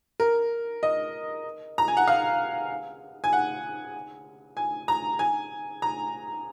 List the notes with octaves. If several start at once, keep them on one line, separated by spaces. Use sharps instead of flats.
A#4
D#5
A#5
G#5
F#5
F5
G#5
F#5
G#5
A#5
G#5
A#5